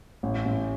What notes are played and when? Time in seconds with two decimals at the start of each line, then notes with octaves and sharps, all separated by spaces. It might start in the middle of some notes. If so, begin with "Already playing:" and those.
0.23 A1
0.45 A1